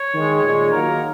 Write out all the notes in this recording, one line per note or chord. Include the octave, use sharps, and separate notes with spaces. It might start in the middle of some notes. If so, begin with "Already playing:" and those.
Already playing: C#5
D#3 G#3
A#2 G#3
D#3 F#3 A#3 A#4